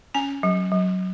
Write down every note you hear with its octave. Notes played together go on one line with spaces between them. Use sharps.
C#4 G#5
F#3
F#3